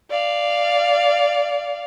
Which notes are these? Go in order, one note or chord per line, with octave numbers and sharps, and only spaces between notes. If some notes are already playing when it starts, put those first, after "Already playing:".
D5 F5